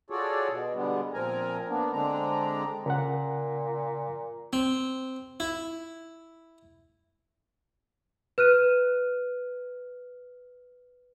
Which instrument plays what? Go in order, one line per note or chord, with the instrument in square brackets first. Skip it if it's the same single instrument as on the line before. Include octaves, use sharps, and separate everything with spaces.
[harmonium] F4 F#4 G#4 A4 C#5 D5
B2
D3 G3 G#3 B3
A#2 F3 C4 A#4 G#5 A#5
A#3 B3 D4
D3 G#3 C4 D4 A#5
[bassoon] A#2 [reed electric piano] C#3 A#4 F#5
[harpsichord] C4
E4
[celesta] B4 F6 F#6 D#7